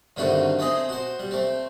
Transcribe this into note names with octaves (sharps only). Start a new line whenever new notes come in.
G2 D3 D#3 A3 C4 F#4
A3 C4 G#4 D#5
F#4 C5
G3
A3 C4